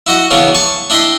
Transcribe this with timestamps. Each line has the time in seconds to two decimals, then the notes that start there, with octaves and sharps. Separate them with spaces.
0.07 E4 F#4 D#5 F#5
0.31 C#3 E3 B3 C#4 D4
0.54 G#5 A5 C#6
0.90 D4 E4 D#5 G5 B5 C6